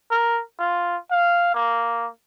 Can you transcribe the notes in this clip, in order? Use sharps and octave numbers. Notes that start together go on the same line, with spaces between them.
A#4
F4
F5
A#3